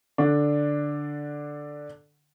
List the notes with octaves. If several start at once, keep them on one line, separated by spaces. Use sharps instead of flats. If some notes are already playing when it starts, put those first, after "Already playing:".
D3 D4